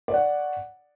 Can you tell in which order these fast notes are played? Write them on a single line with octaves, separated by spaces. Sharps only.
D5 C#5 F#5